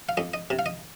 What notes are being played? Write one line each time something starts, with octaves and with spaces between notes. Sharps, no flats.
F5
F2 D#5
D#5
C3
F5
D#5